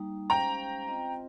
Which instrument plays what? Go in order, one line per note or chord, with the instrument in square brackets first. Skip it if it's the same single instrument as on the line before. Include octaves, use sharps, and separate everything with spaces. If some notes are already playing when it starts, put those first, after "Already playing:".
Already playing: [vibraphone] G3 A#3 D#4
[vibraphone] G#3 C#4 G4 C5 F5 [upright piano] G5 A#5
[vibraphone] C4 F4 C5 D#5